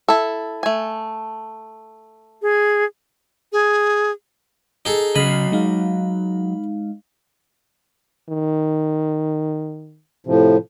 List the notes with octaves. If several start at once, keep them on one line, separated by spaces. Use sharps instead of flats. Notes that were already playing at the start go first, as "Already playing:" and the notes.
E4 A4
A3 G#5
G#4
G#4
D#4 G#4 A4
C#3 F#3 D#5 B5 F6 C7
G#3 D#4 F5
D#3
A2 C3 F3